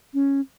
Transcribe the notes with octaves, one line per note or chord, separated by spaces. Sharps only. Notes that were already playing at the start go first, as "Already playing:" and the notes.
C#4